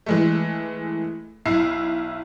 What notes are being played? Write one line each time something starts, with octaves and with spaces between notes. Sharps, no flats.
E3 G#3 A3
B1 E4 C7